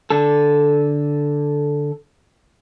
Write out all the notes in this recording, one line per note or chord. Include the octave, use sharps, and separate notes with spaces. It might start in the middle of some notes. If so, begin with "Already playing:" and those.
D3 A4